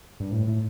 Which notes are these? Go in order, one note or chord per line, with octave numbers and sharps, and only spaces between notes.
G2
A2
A2